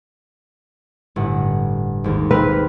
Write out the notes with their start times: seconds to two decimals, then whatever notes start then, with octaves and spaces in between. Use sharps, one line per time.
1.16 G1 A2 F#5
2.04 G#1 D#2
2.31 C4 B4 D#5 F6